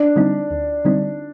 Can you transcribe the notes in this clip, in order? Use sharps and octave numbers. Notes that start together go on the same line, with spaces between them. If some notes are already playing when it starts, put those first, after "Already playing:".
Already playing: D4
D3 G3 C4 D#4
D2
D3 G3 C4 D#4